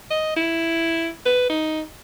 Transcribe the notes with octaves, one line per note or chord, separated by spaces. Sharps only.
D#5
E4
B4
D#4